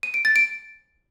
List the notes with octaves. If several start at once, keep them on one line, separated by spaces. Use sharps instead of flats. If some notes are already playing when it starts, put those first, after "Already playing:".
D#7
D7
A6
D7